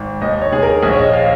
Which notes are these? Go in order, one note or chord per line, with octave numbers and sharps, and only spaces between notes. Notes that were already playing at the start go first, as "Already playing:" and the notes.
Already playing: G#1
D#2 D#5
C#5
D#2 G#4
A#4
A#1 G#4
C#5
D#5
F5